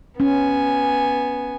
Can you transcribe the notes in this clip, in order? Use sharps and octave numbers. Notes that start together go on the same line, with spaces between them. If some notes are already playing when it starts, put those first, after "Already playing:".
B3 C#4 G#5